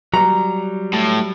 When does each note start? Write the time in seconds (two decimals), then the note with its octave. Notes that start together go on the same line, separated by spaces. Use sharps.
0.14 F#3 G3 A#5
0.93 A2